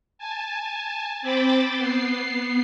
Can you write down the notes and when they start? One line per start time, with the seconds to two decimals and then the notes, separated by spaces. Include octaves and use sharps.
0.18 G#5 A5
1.22 C4 C5 G5 B5 D6 A6
1.76 B3 C7